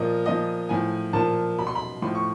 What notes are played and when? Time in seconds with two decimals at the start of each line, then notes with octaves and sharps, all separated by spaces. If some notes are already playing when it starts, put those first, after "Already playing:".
Already playing: A#2 F3 D#5
0.26 A#2 F3 D#5
0.69 A2 F3 G#5
1.13 A#2 F3 A5
1.58 B2 B5
1.67 C6
1.75 B5
2.02 A2 F3 C6
2.15 C#6